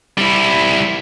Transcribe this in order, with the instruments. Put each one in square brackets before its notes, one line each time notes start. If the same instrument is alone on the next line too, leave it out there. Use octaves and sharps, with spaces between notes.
[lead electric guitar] G3 E4